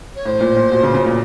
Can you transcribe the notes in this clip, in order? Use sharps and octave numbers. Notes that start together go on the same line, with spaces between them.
C#5
A2 C5
A#2
A#2
B2
C#3
C#3
A#2